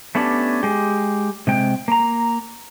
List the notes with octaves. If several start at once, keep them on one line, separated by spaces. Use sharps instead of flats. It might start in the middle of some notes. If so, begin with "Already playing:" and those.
A3 B3 C#4 D4 G4
G#3 G4
C3 G#3 G5
A#3 A#5